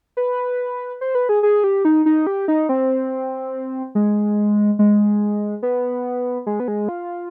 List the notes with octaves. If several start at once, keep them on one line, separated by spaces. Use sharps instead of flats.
B4
C5
B4
G#4
G#4
G4
D#4
D#4
G4
D#4
C4
G#3
G#3
B3
G#3
B3
G#3
F4